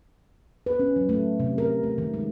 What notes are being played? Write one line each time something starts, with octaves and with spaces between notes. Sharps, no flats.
B4
C#4
F#3
A3
C3
A#4
A3
D#3
G#3